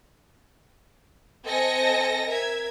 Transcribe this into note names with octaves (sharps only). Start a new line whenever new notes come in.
C4 A4 D#5 G#5 A#6 C#7
A#4 E5 G#6